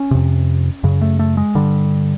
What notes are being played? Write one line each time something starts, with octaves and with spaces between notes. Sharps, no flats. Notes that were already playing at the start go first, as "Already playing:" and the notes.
Already playing: C#4
F2 C3
F#2 C#3
A3
A3
G#3
G2 D3 G3